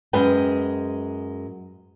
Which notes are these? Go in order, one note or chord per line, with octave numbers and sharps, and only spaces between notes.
F#2 G#3 G#4 B4 G5